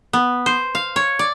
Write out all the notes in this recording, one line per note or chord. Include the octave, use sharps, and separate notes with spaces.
B3
C5
F5
C#5
D5